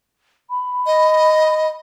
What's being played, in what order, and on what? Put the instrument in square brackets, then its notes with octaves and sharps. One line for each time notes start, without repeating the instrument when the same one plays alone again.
[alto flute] B5
[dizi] D#5